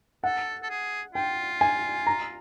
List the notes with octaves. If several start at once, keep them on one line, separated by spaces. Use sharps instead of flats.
A4 F#5
A4
G#4
F4 G5
G#5
A#5